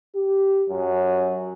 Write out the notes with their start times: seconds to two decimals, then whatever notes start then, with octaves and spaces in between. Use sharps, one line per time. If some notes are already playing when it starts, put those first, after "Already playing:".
0.15 G4
0.69 F#2